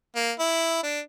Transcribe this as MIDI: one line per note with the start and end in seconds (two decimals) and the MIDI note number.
0.15 0.32 58
0.39 0.80 64
0.83 1.00 62